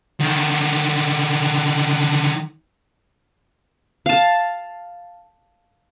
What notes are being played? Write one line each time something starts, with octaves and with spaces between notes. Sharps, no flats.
D3 D#3
F5 A5